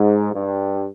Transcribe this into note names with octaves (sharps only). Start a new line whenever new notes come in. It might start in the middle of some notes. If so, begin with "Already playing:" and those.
Already playing: G#2
G2